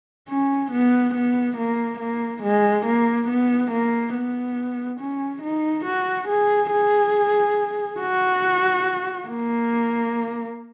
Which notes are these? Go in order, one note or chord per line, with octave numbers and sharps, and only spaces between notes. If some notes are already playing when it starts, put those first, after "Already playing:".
C#4
B3
B3
A#3
A#3
G#3
A#3
B3
A#3
B3
C#4
D#4
F#4
G#4
G#4
F#4
A#3